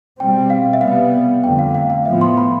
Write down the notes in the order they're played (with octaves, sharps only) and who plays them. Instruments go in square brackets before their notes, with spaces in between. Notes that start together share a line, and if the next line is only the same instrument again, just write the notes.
[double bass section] B2 G3 C4 [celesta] G5
[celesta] F5
E5
[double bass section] C3 G3 B3 [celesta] F5
[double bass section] F2 D3 A3 [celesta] G5
[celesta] F5
F5
F5
[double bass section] A2 F3 B3 [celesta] E5
[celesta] C6
B5